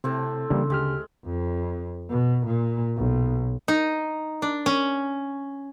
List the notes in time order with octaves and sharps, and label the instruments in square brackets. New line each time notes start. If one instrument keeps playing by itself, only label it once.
[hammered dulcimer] A2 C4 [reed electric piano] C3
[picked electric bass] C#3 D4 [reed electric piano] E3 G3 A#3
[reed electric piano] D2 G4 F6 [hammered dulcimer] G#3
[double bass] F2
B2
A#2
B1
[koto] D#4
D4
C#4